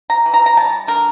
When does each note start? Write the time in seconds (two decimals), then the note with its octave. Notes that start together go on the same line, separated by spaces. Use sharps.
0.10 A#5
0.26 E3
0.34 A#5
0.46 A#5
0.57 G3 A5
0.87 D3 A#4